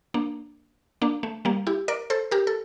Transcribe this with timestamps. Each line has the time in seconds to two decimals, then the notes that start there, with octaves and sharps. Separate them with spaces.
0.14 A#3 D4
1.02 A#3 D4
1.23 A3
1.45 G3 A#3
1.67 E4 G4
1.88 A#4 D5
2.10 A4 C5
2.31 G4 A#4
2.47 A4